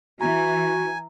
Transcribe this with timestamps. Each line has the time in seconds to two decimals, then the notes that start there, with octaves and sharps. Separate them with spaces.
0.21 E3 F#4 G#5 A#5